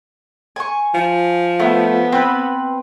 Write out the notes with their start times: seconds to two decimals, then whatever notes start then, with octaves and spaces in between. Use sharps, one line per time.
0.56 G#5 C#6
0.94 F3
1.60 A3 B3
2.12 C4 B4